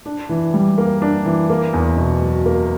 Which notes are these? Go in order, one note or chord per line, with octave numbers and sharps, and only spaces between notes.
D4
E3
G3
A#3
D4
E3
A#3
E2
B2
F#3
A#3